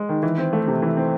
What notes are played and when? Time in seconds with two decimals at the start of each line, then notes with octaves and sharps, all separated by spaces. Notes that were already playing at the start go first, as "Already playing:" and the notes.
Already playing: G#3
0.09 D#3
0.23 E3
0.38 C4
0.53 A3
0.67 C3
0.82 E3
0.97 C4